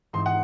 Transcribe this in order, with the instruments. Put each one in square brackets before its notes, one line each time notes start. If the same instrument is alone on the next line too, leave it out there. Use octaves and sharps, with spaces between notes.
[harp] G#2 E3 C4 D#4 [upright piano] C6
[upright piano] F#5